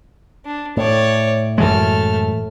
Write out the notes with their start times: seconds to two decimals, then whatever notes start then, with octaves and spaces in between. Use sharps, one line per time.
0.45 D4
0.77 A2 C#5 D5
1.58 F#2 E3 G#3 A3 F6